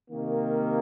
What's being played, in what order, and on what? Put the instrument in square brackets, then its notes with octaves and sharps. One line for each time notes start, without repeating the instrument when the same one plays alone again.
[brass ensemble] C3 D#3 A#3